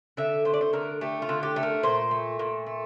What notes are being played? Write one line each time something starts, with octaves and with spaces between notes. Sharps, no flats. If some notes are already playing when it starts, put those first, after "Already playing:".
D3 E5
A3 C5
D5
C5
D3 A#4
A3 G4
F4
D3
G4
A3
A#4
A#2 C5
A3
A#2
A3